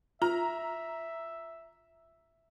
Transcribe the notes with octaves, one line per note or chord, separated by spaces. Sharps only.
F4 E5 A#5